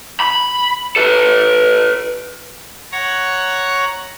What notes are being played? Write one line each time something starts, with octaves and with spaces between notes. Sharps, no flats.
B5
A4 B4
C#5 F#5 A#5 C#6 F#6